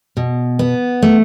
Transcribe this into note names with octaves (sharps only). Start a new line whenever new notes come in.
B2
B3
A3